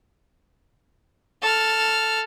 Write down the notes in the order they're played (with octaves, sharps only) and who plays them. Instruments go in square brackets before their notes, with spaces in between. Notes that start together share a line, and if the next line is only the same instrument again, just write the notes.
[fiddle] A4 F6